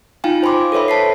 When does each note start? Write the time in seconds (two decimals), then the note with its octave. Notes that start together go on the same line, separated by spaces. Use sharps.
0.24 D#4 F4 F5 G5 G#5
0.43 C5 G#5 B5 C6 D6
0.72 A4 B4 C#5 E5 B5
0.88 C5 A5 B6 C7